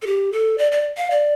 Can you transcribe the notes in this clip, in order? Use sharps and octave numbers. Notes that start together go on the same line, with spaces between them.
A4
G4
A4
D5
D5
F5
D5